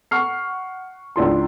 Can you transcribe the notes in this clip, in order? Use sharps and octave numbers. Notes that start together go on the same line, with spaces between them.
F#5 C#6 F6 C7
C#2 D4 E4 C6